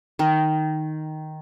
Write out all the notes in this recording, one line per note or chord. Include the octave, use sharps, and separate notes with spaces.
D#3